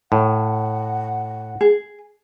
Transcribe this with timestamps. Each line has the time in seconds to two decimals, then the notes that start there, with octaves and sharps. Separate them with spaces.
0.12 A2 F#5
1.61 G#4